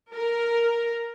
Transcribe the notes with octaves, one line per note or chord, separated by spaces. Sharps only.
A#4